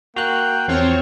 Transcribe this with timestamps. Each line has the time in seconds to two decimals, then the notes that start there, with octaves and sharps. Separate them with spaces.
0.16 A#3 F#4 G5 F#6
0.68 E2 F3 C4 F4 C#5